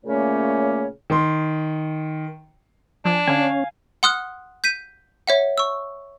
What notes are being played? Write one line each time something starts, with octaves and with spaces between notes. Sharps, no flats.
A#2 C#3 A3 A#3 C#4 C#5
D#3 C6
F3 D4 G#5
D3 C#4 F5 G#5
F#5 C6 D#6 F6 F#6
G6 B6 D#7
C#5 E5 F#5
C#6 E6